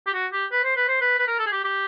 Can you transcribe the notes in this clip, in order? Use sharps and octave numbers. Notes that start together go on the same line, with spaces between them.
G4
F#4
G4
B4
C5
B4
C5
B4
B4
A#4
A4
G#4
G4
G4